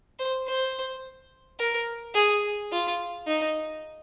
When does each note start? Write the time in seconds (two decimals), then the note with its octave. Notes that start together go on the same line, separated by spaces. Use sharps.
0.19 C5
0.47 C5
1.60 A#4
2.15 G#4
2.72 F4
3.27 D#4